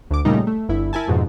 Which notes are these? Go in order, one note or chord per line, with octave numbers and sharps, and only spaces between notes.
D2 D6
A#2 C#3 G3 A3 D#4
A3
G1 E4
E4 A#4 G#5 A5
F2 G#2 B2 F3